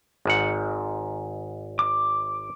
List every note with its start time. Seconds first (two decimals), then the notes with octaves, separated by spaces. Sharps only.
0.25 G#1 G#2 F#5
1.79 D6